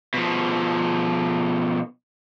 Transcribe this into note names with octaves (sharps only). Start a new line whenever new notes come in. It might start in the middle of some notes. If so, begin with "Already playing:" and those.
B2 F3